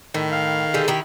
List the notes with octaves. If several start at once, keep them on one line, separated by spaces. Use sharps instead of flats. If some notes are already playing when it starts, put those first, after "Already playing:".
A2 D#3
F5
D3 G4 G#4
D#3 E4 G4